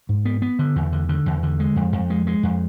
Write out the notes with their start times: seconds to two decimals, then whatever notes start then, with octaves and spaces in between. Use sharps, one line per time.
0.09 G#2
0.25 B3
0.42 B3
0.59 D3
0.76 E2
0.92 D3
1.09 D3
1.26 E2
1.43 D3
1.60 G#3
1.76 F2
1.93 F2
2.10 G#3
2.27 G#3
2.43 F2